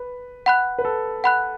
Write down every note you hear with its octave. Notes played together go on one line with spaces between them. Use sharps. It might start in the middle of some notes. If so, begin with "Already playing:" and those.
Already playing: B4
F#5 B5 F#6
B4
A4
F#5 B5 F#6